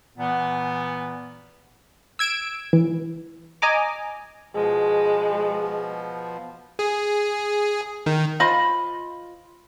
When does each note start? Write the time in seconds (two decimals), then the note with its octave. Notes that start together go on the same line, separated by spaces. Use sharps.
0.17 A#2 E3 B3
2.19 E6 G#6 D7
2.73 E3
3.62 D#5 G#5 A#5 D6
4.54 B2 F3 G#3
6.79 G#4
8.06 D#3
8.40 F4 C5 D#5 B5